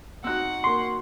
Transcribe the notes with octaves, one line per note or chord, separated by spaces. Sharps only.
C4 D#4 F#4 F#5 E6 F#6
A#3 C6 C#6